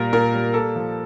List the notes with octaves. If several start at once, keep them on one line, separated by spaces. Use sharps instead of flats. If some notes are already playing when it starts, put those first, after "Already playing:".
Already playing: A#2 G3 A#4
A#2 A#4
G3
A#3 A4
F3